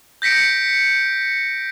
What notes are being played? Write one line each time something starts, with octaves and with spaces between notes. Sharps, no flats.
G6 A#6 B6 C#7 D7